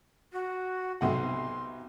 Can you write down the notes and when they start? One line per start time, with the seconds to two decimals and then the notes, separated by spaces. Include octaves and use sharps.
0.32 F#4
1.01 B1 C3 F#5 C6